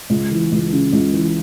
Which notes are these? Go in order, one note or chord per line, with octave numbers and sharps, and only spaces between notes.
C#2
E3
C#2
C#3
C#2
E3